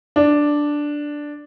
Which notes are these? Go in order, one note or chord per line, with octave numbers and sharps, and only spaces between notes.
D4